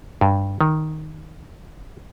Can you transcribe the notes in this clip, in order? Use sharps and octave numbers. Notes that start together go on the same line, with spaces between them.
G2
D#3